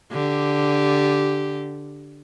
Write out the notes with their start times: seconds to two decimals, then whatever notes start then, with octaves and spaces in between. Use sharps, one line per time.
0.12 D3 G4